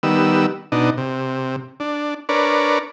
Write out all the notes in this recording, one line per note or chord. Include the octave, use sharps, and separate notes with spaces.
D#3 G3 B3 E6
B2 D4 D#4
C3
D4
D4 A#4 B4 C#5 D5